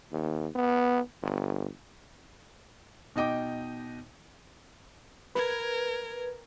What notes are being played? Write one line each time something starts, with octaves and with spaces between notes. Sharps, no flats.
D#2
B3
G1
B2 D#4 D#5 G5 D6
A#4 B4 G#6